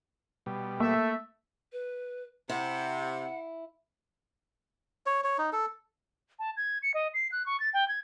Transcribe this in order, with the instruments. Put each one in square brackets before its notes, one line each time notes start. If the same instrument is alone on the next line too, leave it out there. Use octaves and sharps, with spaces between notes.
[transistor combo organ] B2 G3
[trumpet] A3 [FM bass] A#3 [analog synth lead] E5
[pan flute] B4
[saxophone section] C3 [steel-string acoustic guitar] E4 [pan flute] F#5
[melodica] C#5
C#5
D#4
A4
[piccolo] A5
G#6
C#7
D#5
C7
F#6
C#6
A6
G5
G#6